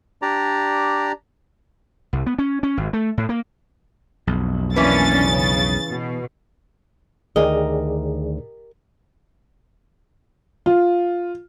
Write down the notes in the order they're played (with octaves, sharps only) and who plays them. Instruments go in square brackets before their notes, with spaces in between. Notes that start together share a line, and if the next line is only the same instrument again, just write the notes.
[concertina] D4 G4 D5 A#5
[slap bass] C2
B3
C#4
C#4
G#1
A3
A2
A#3
B1 F2
[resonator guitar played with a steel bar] E3 B4 [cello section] A#3 C#4 D4 [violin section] A6
[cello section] C#3
B2
[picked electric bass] D2 D#3 [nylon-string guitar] G4 A#4 D#5 [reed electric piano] G#4 D5
[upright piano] F4